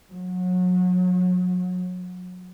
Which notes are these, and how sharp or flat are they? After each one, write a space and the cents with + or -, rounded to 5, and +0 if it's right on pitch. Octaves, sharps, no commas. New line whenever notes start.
F#3 -30